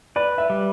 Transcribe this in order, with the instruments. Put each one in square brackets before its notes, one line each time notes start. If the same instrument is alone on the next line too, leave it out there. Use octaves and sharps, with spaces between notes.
[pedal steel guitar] B4 [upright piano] D5
[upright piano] E5
[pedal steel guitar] G3